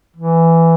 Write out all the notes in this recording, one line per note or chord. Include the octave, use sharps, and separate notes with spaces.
E3